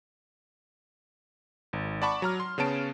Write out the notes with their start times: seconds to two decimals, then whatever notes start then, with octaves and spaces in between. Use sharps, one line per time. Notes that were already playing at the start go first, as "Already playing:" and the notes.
1.73 G#1
2.02 D5 F#5 A5 B5 C#6 D6
2.22 F#3 A#5 F6
2.40 C6
2.58 C#3 B3 C#4 A5 D7